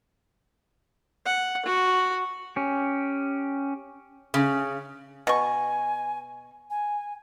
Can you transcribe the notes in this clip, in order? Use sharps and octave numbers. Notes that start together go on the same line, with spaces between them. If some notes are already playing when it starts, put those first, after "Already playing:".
F#5
F#4
C#4 G4
C#3
B2 G#5 C#6
G#5